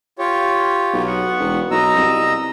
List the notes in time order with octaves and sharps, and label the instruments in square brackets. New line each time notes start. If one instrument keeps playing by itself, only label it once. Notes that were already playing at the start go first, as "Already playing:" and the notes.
[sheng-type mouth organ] F4 G4 C#5
[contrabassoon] B1
[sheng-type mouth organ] B3 F#5 C#6
[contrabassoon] E1
[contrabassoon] B1 [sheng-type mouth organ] D#5 A#5 E6
[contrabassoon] C2